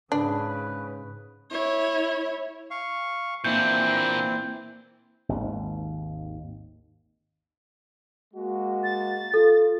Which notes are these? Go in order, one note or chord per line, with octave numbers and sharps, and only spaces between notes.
G#2 C#3 D4 B4
E4 C#5
F5 C#6
A#2 E3 A#3 C4 D4 E4 G6
G#1 D#2
G#3 A#3 F#4
A6
F4 A4